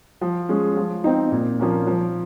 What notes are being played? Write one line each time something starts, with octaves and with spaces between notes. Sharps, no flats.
F3
G#3 C#4
F3
C4 D#4
A#2
F3 A#3 C#4
F3